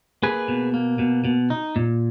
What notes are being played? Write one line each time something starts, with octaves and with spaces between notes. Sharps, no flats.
A#3 G#4 B4
B2
A#3
B2
B2
D#4
A#2